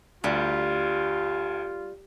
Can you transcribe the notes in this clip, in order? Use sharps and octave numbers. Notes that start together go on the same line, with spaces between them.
D2 G3 F4